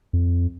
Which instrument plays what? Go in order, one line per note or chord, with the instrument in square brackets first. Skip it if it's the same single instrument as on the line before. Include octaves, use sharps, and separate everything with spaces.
[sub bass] F2